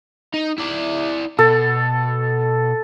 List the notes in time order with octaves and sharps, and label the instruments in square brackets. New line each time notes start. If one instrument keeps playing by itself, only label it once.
[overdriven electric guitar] D#4
E4 D5
[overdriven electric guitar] B2 [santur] A4